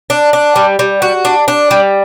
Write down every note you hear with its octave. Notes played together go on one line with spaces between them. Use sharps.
D4
D4
G3
G3
F#4
D4
D4
G3